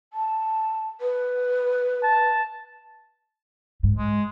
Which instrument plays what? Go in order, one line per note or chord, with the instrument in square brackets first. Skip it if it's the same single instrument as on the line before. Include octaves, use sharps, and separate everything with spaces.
[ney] A5
B4
[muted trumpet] A5
[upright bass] G#2
[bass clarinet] G#3